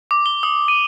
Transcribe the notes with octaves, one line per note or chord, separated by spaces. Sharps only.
D6
G7
D#6
D#7